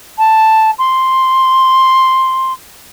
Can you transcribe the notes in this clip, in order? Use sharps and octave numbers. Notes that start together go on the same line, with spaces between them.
A5
C6